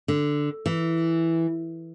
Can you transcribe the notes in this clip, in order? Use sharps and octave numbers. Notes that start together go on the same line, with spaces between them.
D3
E3